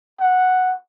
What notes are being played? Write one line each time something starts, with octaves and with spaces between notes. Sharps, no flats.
F#5